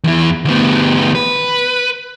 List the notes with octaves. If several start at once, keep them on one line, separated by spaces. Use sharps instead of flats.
E2 E3
D2 B3
B4